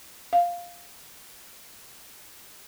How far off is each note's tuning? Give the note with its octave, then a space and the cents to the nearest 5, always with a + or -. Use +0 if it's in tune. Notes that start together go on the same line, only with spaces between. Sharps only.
F5 +0